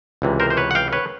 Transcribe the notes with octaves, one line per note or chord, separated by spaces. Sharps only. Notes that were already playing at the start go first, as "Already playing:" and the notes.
C#2 C3 E3 G3
A#4 C5
C5
B4 C#5
F#5
F5 G5
B4 C#5